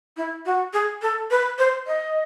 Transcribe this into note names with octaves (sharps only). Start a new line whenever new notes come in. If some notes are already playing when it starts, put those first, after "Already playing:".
E4
F#4
G#4
A4
B4
C5
D#5